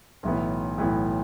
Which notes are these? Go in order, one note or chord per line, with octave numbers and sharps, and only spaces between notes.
B1 A2 E3 B3 E4
B1 A2 E3 B3 E4